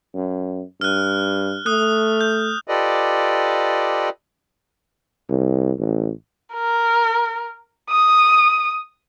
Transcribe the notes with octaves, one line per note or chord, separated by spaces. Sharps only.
F#2
G2 F6 F#6
A3 D#6 F#6
G6
F4 G4 A4 B4 D5 D#5
C2
A1
A#4
D#6